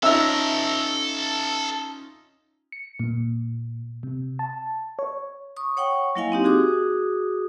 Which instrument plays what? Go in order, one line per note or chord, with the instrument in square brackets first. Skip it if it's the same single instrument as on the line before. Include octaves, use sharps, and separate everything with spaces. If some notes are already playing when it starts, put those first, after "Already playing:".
[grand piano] C#4 D#4 F4 [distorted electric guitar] A4 A#5 [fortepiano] E5 E6
[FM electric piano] C#7
A#2
C3
A5
C#5
[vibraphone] C#6 D#6
C#5 F#5 G5 C#6
F#3 A#3 E4 D#5 F5 G#5
C4 D#4 G4
F#4 G#4 D6 D#6